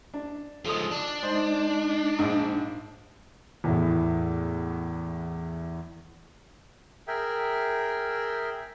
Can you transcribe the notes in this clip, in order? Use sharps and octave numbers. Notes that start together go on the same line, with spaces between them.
D4
F3 G#3 A4 D#6
D4
G#3 D#4 C5 D#5
A#1 G#2
E2 A2
G#4 A#4 E5 G5